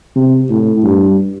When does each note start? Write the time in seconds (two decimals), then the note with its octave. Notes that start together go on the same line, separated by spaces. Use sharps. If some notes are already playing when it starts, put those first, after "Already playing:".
0.16 C3
0.50 A2
0.83 G2